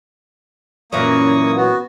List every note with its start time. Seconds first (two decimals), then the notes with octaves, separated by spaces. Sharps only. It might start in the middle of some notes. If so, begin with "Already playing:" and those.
0.92 F#2 A#2 E3 A#3 C#6 D#6
1.56 B3 F#4